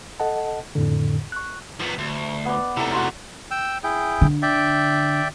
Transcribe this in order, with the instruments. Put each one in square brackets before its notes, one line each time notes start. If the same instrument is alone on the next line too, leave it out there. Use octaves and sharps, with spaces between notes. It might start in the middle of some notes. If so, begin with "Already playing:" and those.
[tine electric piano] A4 D#5 F#5 A5
F2 A2 D3
C#6 F#6
[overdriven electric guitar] F3 B3
D2
[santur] B3 D5
[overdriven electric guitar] C3 A3 [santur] E4 A#5
[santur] F#4 C6
[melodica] G5 E6
E4 G#4 G5
[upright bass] D3
[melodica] D5 E5 G5